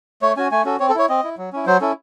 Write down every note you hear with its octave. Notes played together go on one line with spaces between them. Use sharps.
A3 C#5
C#4 F#4 G#5
A3 G#5
C#4 F#4 A4
C4 C#5
A4
E4 C#5
C4 D#5
E4
F#3
C#4 E4
F#3 C5
C#4 E4 A4